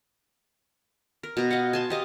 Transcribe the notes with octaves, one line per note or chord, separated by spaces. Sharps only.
A#4
B2 A#5
D#5 F5 F#5
G#5 A5 C6
G4 D#5 F5